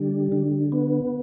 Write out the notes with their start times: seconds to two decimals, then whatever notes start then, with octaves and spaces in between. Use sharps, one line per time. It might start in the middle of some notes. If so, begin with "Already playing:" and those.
Already playing: D3 G3
0.32 D3
0.72 B3